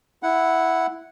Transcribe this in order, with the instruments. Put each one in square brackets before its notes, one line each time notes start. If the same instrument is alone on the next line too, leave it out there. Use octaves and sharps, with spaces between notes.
[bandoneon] E4 F#5